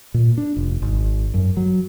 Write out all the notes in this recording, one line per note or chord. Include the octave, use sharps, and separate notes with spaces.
A#2
D4
F1
G#1
F#2
F#3